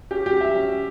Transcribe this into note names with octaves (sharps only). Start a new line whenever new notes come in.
C#4 G4
G4
F#3
E5
C#4